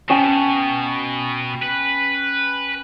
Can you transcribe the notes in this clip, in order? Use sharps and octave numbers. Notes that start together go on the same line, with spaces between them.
B2 C#4 G5 A5
B4